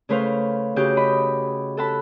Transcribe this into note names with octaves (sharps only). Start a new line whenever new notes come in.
C#3 A3 B4 C5 F5
C#3 F#4 G4 G6
D#5 B5
A4 F#5 A5 B5